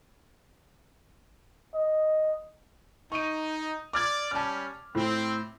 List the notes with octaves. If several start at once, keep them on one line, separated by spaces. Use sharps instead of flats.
D#5
D#4 C#6 D#7
D5 D6 F6 G#6
G3 C#4 A5 F6
A2 C4